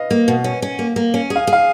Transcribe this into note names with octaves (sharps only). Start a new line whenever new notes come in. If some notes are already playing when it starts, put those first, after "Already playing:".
Already playing: B4 D#5 F5
A#3
B2
C#4
C#4
A#3
A#3
C#4
G#4
F5
G#4
F5